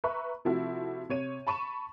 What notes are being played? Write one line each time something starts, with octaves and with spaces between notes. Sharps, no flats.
B4 E5 A#5 B5 C#6
C3 F3 A3 E4 F#4
C3 C#5 D#7
A5 B5 C#6 D#7 E7